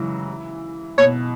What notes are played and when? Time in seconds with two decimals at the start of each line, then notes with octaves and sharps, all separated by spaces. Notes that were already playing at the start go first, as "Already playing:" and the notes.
Already playing: C#3 E3 F#3 G#3
0.98 B2 C#5